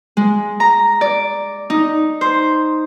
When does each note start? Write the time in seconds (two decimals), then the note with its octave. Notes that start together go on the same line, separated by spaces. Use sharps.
0.17 G#3
0.60 A#5
1.01 D5
1.70 D#4
2.21 C5